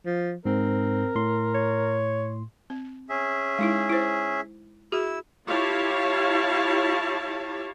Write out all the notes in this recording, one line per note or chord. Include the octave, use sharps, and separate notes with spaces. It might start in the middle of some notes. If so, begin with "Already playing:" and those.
F3
G#2 C4 A#4
A2 C6
C#5
C4
C#4 G#4 E5
G#3 D#4 E4
E4 C5
E4 F#4 G#4 E6
E4 F4 G4 C#5 F5 A5